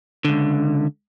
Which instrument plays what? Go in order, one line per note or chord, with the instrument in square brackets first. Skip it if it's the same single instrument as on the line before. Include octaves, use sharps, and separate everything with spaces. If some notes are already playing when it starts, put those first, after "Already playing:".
[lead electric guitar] C#2 D3